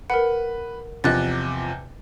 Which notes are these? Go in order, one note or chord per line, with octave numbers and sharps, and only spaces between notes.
A#4 B4 F#5
E2 C3 F3 D#5 F#6 A6